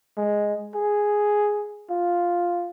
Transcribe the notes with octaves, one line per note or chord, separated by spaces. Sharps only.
G#3
G#4
F4